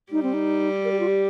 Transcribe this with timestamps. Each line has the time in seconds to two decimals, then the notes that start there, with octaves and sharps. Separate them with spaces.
0.12 G3 D#4
0.23 C4
0.34 D#4
0.84 A#4
0.92 G4
1.00 F4
1.07 G4